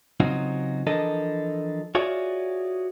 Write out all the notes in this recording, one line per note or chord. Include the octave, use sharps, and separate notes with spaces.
C#3 F#3 C4 D#4 F4 F#4
E3 F3 D4 A4 A#4 D#5
F4 F#4 G#4 C#5 D5 E5